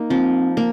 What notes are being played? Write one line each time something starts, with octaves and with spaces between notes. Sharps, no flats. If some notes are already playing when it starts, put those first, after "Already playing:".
Already playing: A#3 D#4
F3 C4
A#3